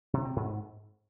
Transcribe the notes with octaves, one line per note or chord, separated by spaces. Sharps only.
C3
C4
G#2